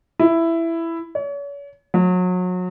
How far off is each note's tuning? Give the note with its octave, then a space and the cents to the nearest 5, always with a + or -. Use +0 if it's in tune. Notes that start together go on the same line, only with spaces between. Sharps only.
E4 +10
C#5 +40
F#3 -30